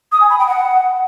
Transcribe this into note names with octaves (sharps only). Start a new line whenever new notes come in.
D#6
G#5
B5
G5
F#5